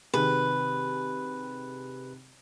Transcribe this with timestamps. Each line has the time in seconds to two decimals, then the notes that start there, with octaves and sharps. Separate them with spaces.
0.14 C3 D#3 G#4 B4